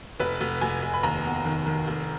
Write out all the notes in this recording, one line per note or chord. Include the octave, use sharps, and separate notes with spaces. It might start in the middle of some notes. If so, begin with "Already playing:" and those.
F1 B4
F1
F1 G#5
F1
B5
D#2 A#5
B3
D#3
D#3
F1